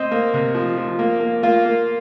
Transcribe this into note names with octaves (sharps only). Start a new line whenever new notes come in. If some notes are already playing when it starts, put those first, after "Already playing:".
Already playing: C4 D#5
A#3
C3
F3
F3
A#3
A#3
A#3 F4
A#3